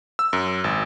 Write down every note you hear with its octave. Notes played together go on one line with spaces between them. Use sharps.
E6
F#2
G#1